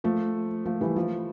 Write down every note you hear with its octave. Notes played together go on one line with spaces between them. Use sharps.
F3 A3
F3 A3
E3 G3
F3 A3